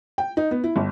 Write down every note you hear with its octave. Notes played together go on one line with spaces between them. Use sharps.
G5
D#4
B3
E4
G1